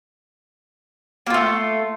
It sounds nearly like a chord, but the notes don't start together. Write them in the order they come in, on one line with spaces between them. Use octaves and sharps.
A#3 F4 A3